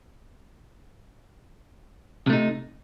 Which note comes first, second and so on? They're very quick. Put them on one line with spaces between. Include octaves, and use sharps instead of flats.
C3 A3 D#4